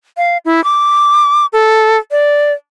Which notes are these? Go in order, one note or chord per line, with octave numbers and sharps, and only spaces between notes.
F5
E4
D6
A4
D5